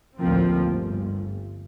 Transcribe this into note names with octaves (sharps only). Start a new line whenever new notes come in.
A1 D2 F3 A#3 C4
G1